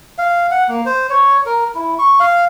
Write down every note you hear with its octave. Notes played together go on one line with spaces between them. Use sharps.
F5
F#5
A#3
C5
C#5
A#4
E4
C#6
F5